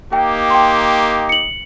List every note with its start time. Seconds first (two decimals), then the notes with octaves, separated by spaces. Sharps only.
0.13 A#3 D#4 G4 G5
0.50 G5 C6
1.29 C#7 F#7